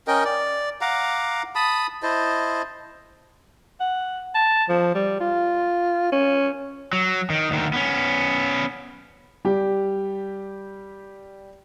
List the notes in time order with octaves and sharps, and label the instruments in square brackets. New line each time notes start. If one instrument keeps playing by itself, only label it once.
[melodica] C#4 A#4 D#5 G5
D5
F5 F#5 A#5 D6
A5 B5 D#6
E4 C5 D#5 A5
[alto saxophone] F#5
A5
F3
G3
F4
C#4
[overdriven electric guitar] F#3
D#3
D2 D#3
B3 C#4
[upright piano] G3 G4